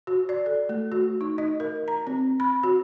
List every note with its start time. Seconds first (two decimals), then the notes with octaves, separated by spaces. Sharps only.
0.07 F#4
0.29 D5
0.46 A4
0.69 A3
0.92 F#4
1.21 D#4
1.38 D#5
1.60 A#4
1.88 A#5
2.07 C4
2.40 B5
2.63 F#4